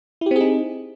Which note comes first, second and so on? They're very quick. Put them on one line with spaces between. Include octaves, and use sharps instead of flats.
E4 G4 C4 G#4 D#4